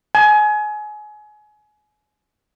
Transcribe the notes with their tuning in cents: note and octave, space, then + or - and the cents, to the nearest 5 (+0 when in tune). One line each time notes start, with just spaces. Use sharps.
G#5 +25